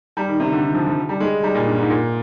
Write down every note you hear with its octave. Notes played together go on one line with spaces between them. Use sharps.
G3
D#3
C3
D3
D#3
F3
F3
G3
G#3
G3
A#2
G2
G#2
A#2